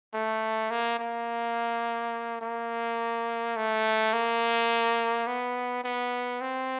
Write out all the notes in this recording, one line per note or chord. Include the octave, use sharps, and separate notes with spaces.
A3
A#3
A#3
A#3
A3
A#3
B3
B3
C4